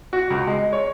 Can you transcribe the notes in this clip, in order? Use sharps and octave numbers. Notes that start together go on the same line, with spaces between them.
F#4
C#2
G#3
C#5